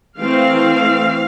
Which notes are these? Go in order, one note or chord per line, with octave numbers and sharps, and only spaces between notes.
E3 A3 C4 F5